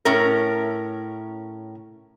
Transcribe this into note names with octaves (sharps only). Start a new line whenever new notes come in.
A2 C#4 A#4